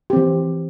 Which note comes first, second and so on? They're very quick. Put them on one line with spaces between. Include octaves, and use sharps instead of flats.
G4 C4 E3